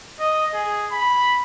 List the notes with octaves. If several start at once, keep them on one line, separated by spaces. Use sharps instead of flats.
D#5
G#4
B5